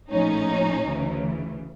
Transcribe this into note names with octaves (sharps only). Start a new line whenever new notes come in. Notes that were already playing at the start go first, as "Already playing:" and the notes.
A#1 A2 F3 C#4 D#4
D2 C#3 E3